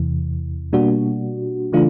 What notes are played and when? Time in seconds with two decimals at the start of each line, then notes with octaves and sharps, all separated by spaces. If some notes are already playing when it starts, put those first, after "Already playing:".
Already playing: E2 C3 E3
0.73 B2 G3 A#3 D4 F#4
1.72 C#3 E3 A3 D4 F4